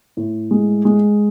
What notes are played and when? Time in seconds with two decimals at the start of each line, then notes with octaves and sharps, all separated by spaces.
0.17 A2
0.51 G#3
0.85 G#3